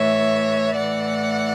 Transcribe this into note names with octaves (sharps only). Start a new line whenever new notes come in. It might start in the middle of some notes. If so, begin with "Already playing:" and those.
Already playing: A2 E3 C#5 E5
A2 E3 D5 F#5